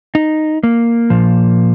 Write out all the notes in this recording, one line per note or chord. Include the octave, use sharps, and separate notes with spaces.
D#4
A#3
A#2 F3